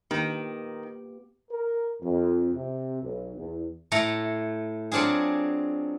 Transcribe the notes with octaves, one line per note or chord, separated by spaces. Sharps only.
D#3 A#3 B3 G4
A#4
F2
C3
B1
E2
A2 A3 A4 A#5
F#3 C4 D4 F4 G#4